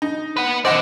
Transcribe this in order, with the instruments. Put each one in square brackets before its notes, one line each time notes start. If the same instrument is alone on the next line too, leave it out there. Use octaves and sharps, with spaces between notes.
[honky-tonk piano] D#4
[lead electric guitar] B4 F#5
[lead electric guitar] B2 D5 [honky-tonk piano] C5 D#5 F#5